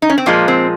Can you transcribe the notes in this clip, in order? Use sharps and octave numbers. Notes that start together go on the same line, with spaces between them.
D#4
C#4
C4
A#2 F3 G#3 A#3
C4